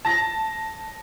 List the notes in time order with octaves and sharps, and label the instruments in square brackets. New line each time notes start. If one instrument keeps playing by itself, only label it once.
[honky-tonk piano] A5 A#6